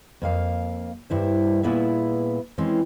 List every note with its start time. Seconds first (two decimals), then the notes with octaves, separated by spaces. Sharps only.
0.22 F2 A#3 F5
1.10 G2 E4 C5
1.63 A#2 B3 E4 G#4 B4 E5
2.58 E3 G#3 C4 C#4